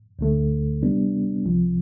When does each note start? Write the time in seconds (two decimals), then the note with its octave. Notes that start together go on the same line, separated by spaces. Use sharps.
0.19 D2 D3 A3
0.83 C3 G3 B3 D4
1.45 C2 C3 F3